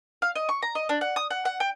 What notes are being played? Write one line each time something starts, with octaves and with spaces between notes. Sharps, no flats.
F5
D#5
C#6
A#5
D#5
D4
F#5
D#6
F#5
F#5
G5